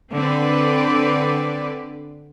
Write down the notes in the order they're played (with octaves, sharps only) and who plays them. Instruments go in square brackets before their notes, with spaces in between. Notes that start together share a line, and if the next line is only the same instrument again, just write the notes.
[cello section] D3 C4 B4 D5